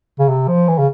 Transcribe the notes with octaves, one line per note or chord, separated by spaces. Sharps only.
C#3
C3
F3
E3
C#3